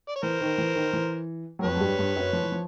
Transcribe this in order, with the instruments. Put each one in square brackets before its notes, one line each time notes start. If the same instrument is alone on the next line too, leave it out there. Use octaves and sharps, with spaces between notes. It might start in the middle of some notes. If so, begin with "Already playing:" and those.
[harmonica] D5
C#5
[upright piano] E3 [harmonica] A#4 C5
[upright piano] D#3
E3
D#3
E3
F#3
[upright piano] F2 F3 [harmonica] B4 C#5
[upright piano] F#3
G2 G3
G2 G3
F#2 F#3
F3
E3
F3